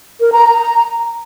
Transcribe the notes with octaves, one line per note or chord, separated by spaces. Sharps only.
A#4
A#5
A#5